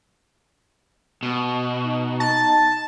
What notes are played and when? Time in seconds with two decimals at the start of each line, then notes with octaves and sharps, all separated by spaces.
1.23 B2
1.85 D#4
2.20 A5